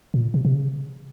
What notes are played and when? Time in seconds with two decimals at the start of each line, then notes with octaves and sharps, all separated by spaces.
0.14 A#2
0.34 C3
0.45 C3
0.54 C#3